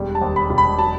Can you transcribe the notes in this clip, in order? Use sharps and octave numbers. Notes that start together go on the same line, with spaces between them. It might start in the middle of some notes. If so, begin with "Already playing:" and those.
Already playing: E1 G3
A5
D#2
B5
E1
B5
F#3 A5